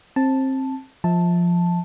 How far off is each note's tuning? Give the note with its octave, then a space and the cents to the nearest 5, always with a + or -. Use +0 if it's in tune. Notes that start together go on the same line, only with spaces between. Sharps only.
C4 +25 A5 +0
F3 +0 E5 -30 A5 +0